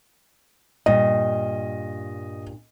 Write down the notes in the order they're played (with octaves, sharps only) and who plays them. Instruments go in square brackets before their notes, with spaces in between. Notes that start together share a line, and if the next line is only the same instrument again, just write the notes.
[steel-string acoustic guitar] G2 A#2 [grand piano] D#5